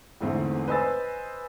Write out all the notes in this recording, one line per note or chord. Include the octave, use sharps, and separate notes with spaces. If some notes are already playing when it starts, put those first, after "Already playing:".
E2 G#2 D3 A3 C4
B4 C5 D#5 G#5 E6 A6